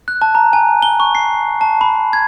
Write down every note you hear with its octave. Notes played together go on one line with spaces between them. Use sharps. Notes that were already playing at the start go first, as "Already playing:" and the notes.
F#6
A5
A#5
G#5
G7
C#6
C7
A5
B5
G#6